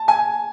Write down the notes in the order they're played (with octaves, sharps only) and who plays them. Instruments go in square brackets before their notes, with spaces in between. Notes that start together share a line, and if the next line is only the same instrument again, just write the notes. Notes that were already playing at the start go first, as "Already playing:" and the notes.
Already playing: [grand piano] A5
G#5